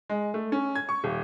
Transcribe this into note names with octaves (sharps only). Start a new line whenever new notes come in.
G#3
A3
C#4
G#6
C#6
D#1